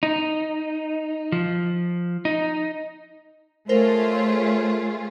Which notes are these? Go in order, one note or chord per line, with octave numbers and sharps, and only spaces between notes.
D#4
F3
D#4
A3 F4 G#4 A#4 C5 C#5